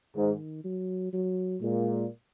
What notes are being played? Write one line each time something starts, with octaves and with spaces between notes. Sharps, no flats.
G#2 D#3
F#3
F#3
A#2 G#3